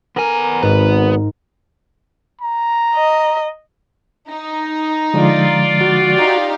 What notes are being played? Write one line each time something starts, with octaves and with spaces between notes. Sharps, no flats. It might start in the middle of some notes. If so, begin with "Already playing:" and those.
B3 A#4 G#5
G#1 G#2 B3 B4
A#5
D#5
D#4
D3 F3 G#3 F4 D5
F#4
D#4 G4 F5